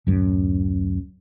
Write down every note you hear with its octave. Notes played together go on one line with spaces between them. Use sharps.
D1 F#2